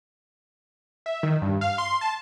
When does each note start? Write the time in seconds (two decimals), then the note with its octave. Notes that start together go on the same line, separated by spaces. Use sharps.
1.06 E5
1.23 D#3
1.42 G2
1.61 F5
1.78 C6
2.01 A5